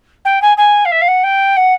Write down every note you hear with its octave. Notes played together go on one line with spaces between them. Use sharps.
G5
G#5
G#5
F5
E5
F5
F#5
G5
F#5